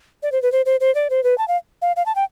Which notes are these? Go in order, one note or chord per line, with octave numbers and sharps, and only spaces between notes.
D5
C5
B4
C5
C5
C5
D5
C5
B4
A5
F5
F5
F5
A5
G5